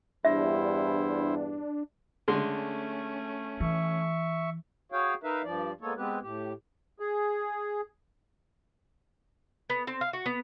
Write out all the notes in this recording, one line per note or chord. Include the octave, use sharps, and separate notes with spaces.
E2 G2 D4 E4 C5 E5
D3 G#3 A3 C#4 C6
E3 E5 C#6
F#4 G#4 C#5 F5 G5
D#4 A#4 B4 E5 F5
G2 F3 D5
G#3 A#3 B3 A4 C#5
G#3 B3 C4 G4 B4
A2 G4
G#4
B3
C4
F5
F#4
B3